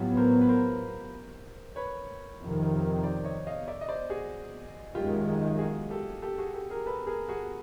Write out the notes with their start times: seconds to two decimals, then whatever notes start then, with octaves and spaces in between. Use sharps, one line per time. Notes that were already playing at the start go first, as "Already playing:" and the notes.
Already playing: A2 F#3 B3 F4 G4
0.17 A#4 C5
0.41 B4
0.49 A#4 C5
1.76 B4 C#5
2.40 F2 C3 D#3
3.03 C5 D5
3.25 C#5 D#5
3.47 D#5 F5
3.68 D5 E5
3.81 D#5
3.88 C5 D5
4.10 F#4 G#4
4.95 F#2 D#3 G#3 F4 G4
5.59 F#4 G#4
5.90 G4 A4
6.22 G4 A4
6.38 F#4 G#4
6.54 G4 A4
6.70 G#4 A#4
6.86 A4 B4
7.07 G#4 A#4
7.28 F#4 G#4